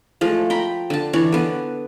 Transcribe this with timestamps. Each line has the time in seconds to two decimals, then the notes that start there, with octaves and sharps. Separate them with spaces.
0.21 F3 G#3 A3
0.50 G5 A#5 B5
0.90 D3 A5
1.13 E3 D4 C#5
1.32 D3 B3